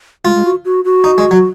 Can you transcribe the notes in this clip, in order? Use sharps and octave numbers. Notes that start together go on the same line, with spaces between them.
G#3 F4
G#3
F#4
F#4
F#4
D#4
G#3
F#3